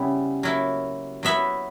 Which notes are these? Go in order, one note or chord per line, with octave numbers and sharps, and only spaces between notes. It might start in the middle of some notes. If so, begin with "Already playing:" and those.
Already playing: C#3 G3 B3 E4
F#3 A#3 E4
F#3 B3 E4 E5